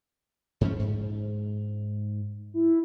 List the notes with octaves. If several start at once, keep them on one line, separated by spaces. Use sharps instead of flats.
G#2 F3 C#4
G#2
E4